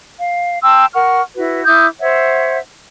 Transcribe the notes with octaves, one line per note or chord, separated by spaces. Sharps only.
F5
G5 A5 C6 E6
A#4 F#5 C#6 F6
E4 F#4 B4
E4 D6 D#6 G6
C5 C#5 E5 F#5